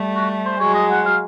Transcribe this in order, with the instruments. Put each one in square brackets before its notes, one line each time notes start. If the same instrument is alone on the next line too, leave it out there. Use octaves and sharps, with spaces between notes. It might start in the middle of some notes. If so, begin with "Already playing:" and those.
Already playing: [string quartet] G3 A3
[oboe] F#4
C5
[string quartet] F#3 G#3 [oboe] C#5
[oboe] D#5
F#5
F5